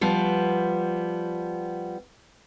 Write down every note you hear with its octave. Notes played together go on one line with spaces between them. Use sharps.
F3 G3 B3